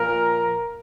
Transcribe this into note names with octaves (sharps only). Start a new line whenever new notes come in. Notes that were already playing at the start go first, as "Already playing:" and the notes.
Already playing: A#2 F3 A#4